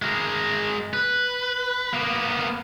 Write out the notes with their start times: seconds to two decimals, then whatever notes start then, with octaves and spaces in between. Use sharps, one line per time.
0.02 G#3 A#4
0.93 B4
1.93 A#3 B3